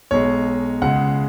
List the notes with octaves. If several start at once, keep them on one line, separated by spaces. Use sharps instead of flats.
B1 B2 G#3 C#5
C#2 C#3 G#3 F#5